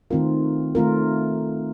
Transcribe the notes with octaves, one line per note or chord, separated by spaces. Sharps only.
D#3 A3 C4 F4 A#4
D#3 A3 C4 F4 A#4